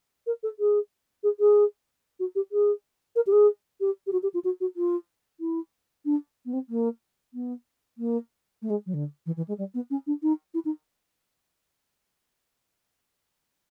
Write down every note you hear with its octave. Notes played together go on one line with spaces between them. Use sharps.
A#4
A4
G#4
G#4
G#4
F#4
G4
G#4
A#4
G4
G#4
G4
G4
F#4
G4
F4
F#4
F#4
F4
E4
D4
B3
C4
A#3
B3
A#3
A3
G#3
F#3
D3
E3
E3
G#3
G3
B3
C#4
D4
D#4
E4
D#4